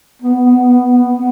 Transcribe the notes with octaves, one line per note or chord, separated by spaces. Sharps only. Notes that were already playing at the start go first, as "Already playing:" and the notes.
B3
B3
B3
B3
B3